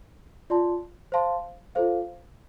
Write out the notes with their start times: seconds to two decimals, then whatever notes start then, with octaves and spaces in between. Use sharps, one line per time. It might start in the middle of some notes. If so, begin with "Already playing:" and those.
0.50 F4 D5 A5 C6
1.12 C5 F5 A5 C6
1.75 F4 A4 C5 F5